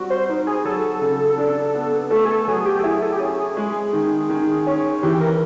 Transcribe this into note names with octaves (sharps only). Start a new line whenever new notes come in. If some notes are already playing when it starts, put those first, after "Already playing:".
Already playing: G3 C4 F#4
C5
D#4
G#4
F#3 A4
C#3
D4
B3
A3 A4
G#4
A4
F#3 G#4
G4
A4
E4 G#4
A4
G4
C#4 G#4
G#4
G#3
D#3
D#3
C#4
E3 G4
A#4